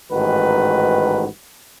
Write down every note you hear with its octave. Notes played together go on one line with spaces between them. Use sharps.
A1 G#2 D#3 F#4 B4